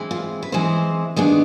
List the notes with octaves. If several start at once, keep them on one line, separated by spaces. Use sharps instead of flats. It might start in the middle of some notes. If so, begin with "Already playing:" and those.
Already playing: E3 G#3 C4
F4
B4
E3 G#3 C4 C5
D#3 G#3 B3 D4